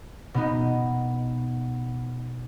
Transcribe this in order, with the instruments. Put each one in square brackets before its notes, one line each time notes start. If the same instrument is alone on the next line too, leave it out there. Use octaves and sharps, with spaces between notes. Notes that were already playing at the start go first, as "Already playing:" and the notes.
[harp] B2 B3 D#4